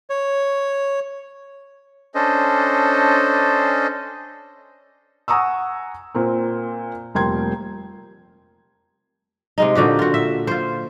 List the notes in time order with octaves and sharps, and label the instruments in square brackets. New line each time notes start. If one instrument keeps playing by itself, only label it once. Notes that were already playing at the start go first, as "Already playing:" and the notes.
[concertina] C#5
[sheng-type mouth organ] C#4 D4 A4 C5 D#5
[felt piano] F#5 G#5 A#5 C#6 D#6 E6
A#2 A#3 C4
F1 G3 A#3 G5 C6 G#6
[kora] C3 G#3 D#4
A#2 D3 F#4 G4
F4 F#4
E5
F4 C5